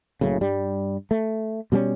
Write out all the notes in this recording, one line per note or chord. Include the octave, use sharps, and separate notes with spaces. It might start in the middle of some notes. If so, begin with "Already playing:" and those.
F#1 F#2 A2 C#3
G2 G3
A3
B2 G3 A3 C#4